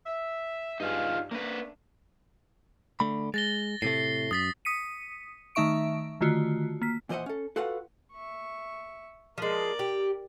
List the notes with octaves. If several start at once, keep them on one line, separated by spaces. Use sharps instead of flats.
E5
G2 D#4 F4 G#4
A3 A#3 C#4 D4 B4
D3 A3 B5
G#3 A6 A#6 G7
A2 C3 A3 C7
F#2 D#6 A6 B6
D#6 B6 C#7 D#7
D#3 A3 D#4 E5 C#6 D7
D3 D#3 A3 F4 F#4
A#3 B6
A#2 E3 C5 D#5 E5 F#5
C#4 A4
F4 F#4 A4 B4 F5 F#5
E5 C#6
F3 G#3 A#4 D5
G4